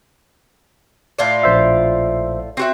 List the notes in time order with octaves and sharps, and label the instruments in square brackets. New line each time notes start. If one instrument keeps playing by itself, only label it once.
[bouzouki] A2 F4 D5
[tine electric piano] A#1 C5 E5
[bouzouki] C4 F#4 E5